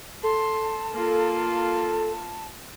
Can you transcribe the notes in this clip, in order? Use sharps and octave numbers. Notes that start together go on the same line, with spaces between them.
A4 A5 C6
A#3 F4